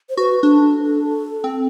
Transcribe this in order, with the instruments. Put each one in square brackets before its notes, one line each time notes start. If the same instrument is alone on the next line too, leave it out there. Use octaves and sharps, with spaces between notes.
[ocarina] C5
[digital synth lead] F#4 [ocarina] B4
[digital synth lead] D4 [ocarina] A4
[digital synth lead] C4